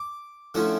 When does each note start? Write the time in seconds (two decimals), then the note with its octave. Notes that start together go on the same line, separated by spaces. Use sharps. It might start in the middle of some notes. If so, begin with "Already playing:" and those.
Already playing: D6
0.54 D3 F3 A3 C#4 E4